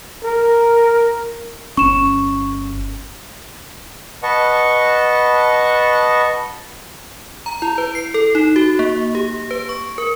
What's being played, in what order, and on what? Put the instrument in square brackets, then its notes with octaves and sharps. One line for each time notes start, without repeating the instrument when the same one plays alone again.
[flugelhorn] A#4
[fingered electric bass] G1 C#4 [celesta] C#6 E7
[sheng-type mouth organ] B4 D#5 F#5 A5 C#6
[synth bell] A#5
E4
B4
C7
A4
D#4
F#4
A#3
G4
B4
C#6
A#4